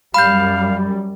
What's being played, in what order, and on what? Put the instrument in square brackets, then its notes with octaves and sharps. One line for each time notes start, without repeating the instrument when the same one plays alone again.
[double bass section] F#2 G3 [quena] F5 [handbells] B5 G6